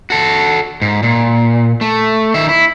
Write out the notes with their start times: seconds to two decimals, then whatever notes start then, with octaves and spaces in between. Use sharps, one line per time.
0.10 F#4 A4
0.82 G#2
1.03 A#2
1.81 A3
2.34 D#3 E5
2.49 E4